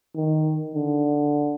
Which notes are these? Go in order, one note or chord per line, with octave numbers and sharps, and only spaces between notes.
D#3
D3